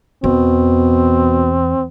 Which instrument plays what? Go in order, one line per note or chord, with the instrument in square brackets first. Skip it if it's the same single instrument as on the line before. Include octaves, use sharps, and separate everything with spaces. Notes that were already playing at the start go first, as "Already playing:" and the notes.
[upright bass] E2 [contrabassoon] B2 [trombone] C4